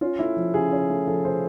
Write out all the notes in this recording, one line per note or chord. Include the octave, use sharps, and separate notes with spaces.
C#4 F4
A3 E4
F3
C#3 G#4
C#4
A3
F3 A4
C#3 C5